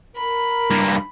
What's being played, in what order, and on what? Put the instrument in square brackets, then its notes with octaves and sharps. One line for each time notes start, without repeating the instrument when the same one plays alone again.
[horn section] A#4 [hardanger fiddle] B5
[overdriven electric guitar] G2 A#3